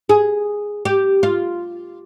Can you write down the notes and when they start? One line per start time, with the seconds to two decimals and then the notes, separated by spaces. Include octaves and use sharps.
0.09 G#4
0.85 G4
1.23 F4